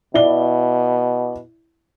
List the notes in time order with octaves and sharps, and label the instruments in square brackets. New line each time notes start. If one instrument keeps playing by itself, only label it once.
[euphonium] B2 [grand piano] E4 D5 G7